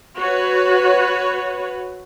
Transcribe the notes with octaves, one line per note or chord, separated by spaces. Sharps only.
F#4 B4 C#5